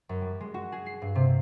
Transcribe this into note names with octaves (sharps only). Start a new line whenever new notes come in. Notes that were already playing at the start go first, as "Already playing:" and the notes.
F#2
G3
G#3
F#4
G#4
C7
G2
C3